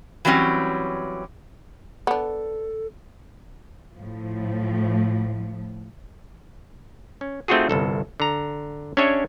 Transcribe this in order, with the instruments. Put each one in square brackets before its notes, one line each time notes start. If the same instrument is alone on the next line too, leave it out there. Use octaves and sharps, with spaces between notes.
[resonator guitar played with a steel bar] E3 F#3 G3 C4 C#4
[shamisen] B3 D4 [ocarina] A4
[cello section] A2 F3
[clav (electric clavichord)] C#4
A3 C4 D#4 F4 F#4 G#4
G1 C2 A4
D3 A#5
C#4 D4 G4 C#5 E5 G#5